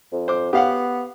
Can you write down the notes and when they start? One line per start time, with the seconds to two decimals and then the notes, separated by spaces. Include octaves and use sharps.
0.12 F2
0.28 C5 D6
0.53 B3 G4 F5 F#5